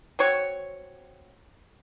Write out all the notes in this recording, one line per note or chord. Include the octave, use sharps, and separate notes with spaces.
C4 F#4 C#5